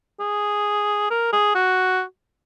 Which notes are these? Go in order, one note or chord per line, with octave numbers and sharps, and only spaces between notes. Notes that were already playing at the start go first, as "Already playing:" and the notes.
G#4
A#4
G#4
F#4